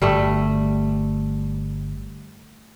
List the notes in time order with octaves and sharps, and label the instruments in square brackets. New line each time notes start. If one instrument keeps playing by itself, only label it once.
[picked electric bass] G1 [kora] G3 A3